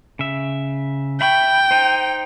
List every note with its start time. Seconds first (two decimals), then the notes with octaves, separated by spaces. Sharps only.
0.19 C#3 E5
1.21 E5 G5 B5 C#6
1.71 D#4 C5